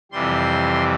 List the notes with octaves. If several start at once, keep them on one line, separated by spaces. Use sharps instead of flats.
F2 C3 E3 G3 C6